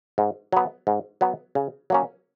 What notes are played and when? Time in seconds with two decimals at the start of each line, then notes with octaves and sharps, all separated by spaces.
0.18 G#2
0.52 F#3 B3
0.87 G#2
1.21 F#3 B3
1.55 C#3
1.90 F#3 A#3 C#4